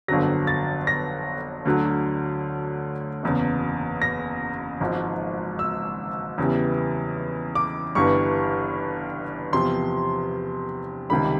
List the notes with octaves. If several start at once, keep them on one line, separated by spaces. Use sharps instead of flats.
G1 F2 D3 F#3 A#6
A6
A#6
D2 D3 F#3
F#1 E2 C#3
A#6
G#1 G#2 F3
E6
E2 C#3 E3 G3
D6
G1 G2 E3 G3 C#6
E2 C3 F3 C6
C#2 C3 D#3 G3 B5